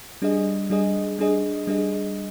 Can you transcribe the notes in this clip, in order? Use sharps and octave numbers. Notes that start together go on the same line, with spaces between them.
G3 D4 G#4 D#5
G3 D4 G#4 D#5
G3 D4 G#4 D#5
G3 D4 G#4 D#5